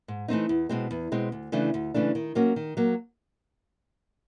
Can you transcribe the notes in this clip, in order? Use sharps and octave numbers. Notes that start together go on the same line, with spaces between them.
G#2
E3 A3 C4 D#4
E2
B2 G#3 C4
E2
B2 G#3 C4
D2
C#3 E3 A3 D4
D2
C#3 E3 A3 D4
D#3
F#3 A#3 C#4 F#4
D#3
F#3 A#3